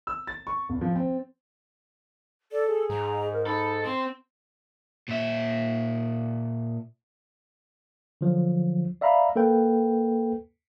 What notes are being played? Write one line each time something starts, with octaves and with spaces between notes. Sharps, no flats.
E6
A6
C#6
E2
F3
C4
A4 D5
G#4
G#2 A#5
A#4
D#4 A4 B5
C4 C6
A#2 E5
D3 F3 F#3
D5 E5 F5 A#5 B5
A#3 A4 B4 G5